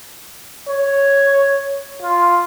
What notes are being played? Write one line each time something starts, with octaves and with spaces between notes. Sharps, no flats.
C#5
F4